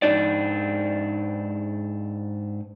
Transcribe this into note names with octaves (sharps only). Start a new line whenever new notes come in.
G#2 D4 D#4 D5